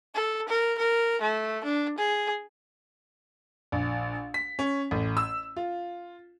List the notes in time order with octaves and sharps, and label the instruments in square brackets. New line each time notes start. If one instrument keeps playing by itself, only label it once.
[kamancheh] A4
A#4
A#4
A3
D4
G#4
[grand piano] A#1
B6
C#4
A1
E6
F4